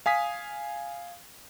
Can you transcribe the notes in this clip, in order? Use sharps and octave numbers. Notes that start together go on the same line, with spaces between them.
F5 G#5 D#6 B6